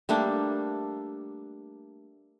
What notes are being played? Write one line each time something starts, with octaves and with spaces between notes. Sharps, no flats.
G3 A3 A#3 D4